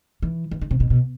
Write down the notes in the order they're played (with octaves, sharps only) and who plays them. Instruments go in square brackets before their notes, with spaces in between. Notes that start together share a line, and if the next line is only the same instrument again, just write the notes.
[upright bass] E3
E3
D3
C3
B2
B2